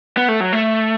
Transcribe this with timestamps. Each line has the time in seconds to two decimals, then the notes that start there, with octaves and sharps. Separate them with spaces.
0.17 B3
0.28 A3
0.40 F#3
0.53 A3